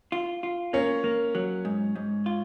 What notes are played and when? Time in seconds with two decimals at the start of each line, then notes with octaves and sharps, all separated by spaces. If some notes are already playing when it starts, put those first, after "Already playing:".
0.12 F4
0.43 F4
0.73 A#3 C#4
1.04 A#3
1.35 F#3
1.65 G#2
1.96 G#2
2.26 F4